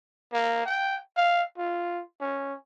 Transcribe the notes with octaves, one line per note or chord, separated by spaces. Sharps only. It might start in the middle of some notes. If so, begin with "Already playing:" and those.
A#3
G5
F5
F4
C#4